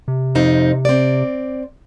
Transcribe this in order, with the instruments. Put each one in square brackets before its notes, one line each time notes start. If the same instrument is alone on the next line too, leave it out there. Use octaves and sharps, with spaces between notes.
[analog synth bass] C3
[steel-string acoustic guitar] F2 C4 D#4
C4 D5